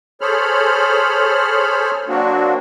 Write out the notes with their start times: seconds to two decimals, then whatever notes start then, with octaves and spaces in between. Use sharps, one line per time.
0.21 G#4 A4 C5 C#5 B5 F6
2.08 F#3 A#3 C4 D4 F#4